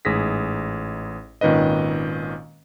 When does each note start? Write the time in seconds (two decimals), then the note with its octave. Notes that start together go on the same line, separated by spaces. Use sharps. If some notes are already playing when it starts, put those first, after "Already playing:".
0.05 A1 G#2 G#4 A#6 B6
1.41 G#1 A#2 D#3 C#4 B4 D#5